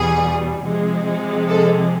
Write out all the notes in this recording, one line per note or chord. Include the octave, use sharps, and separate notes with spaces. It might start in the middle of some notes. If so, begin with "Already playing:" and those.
Already playing: E2 B2 G3 G#4
C3 F3 G#3
A4